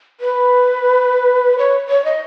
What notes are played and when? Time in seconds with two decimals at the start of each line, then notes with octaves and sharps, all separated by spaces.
0.20 B4
1.58 C#5
1.89 C#5
2.05 D#5